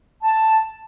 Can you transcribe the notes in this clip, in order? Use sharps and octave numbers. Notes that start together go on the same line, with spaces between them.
A5